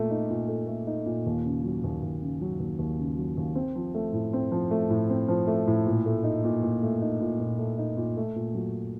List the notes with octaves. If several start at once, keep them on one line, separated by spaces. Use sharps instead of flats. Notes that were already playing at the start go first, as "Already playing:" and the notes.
Already playing: A#2 A3 A4
D#4
A#2
A4
A3
D#4
A#2
D#2
C#3
F#3
D#2
D#2
C#3
F#3
D#2
D#2
C#3
F#3
D#2
C4
F3
A3
A2
C4
F3
A3
A2
C4
F3
A3
A2
A#2
A3
D#4
A#2
A#2
A3
D#4
A#2
A#2
A3
D#4
A#2
A3
A#2
F#3